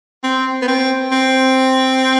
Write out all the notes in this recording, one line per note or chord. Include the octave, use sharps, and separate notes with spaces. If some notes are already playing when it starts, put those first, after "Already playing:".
C4
B3
C4
C4